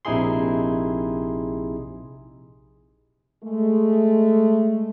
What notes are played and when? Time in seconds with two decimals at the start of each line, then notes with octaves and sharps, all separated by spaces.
0.05 A#1 C3 D#4 E4 G#4 C6
3.43 G#3 A3